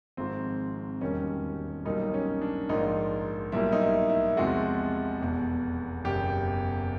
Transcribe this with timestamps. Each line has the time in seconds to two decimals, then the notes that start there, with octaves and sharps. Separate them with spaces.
0.17 G#1 G#2 F3 C4
1.01 E1 D#2 D#3 G3 C#4
1.85 B1 A#2 G3 A#3 D#4
2.14 C#4
2.41 D4
2.69 A#1 G#2 F3 A#3 D#4
3.52 B1 A#2 G3 A#3 E4
3.72 D#4
3.81 E4
4.09 E4
4.37 E2 C3 F3 G#3 F#4
5.21 F1 E2 B2
6.04 F#1 E2 B2 G4